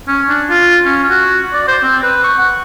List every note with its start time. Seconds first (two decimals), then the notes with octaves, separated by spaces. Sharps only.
0.08 C#4
0.29 D4
0.49 F4
0.85 C#4
1.09 F#4
1.53 D5
1.68 C5
1.83 C4
2.03 B4
2.24 C#6
2.38 F#5